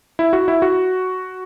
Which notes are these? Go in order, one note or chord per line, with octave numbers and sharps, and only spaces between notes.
E4
F#4
E4
F#4